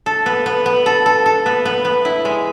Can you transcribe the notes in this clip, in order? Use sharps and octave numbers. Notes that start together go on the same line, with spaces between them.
A4
B3
B3
B3
A4
A4
A4
B3
B3
B3
E4
G#3